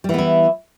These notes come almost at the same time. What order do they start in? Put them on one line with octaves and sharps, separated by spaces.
G3 E3 B3 E4